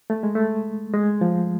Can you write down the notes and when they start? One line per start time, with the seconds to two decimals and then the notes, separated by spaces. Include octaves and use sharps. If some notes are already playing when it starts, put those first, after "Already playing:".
0.10 A3
0.23 G#3
0.35 A3
0.94 G#3
1.21 F3